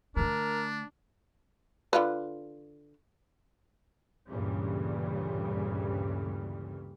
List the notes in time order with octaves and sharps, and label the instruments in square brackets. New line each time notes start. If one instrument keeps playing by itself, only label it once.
[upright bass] D3 A3 [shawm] D4 [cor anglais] A#4
[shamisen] D3 F4 B4
[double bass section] D2 G2 A#2 C#3 E3 G3